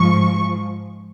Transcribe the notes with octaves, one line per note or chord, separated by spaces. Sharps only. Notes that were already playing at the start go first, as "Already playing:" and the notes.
Already playing: G#2 F3 C#6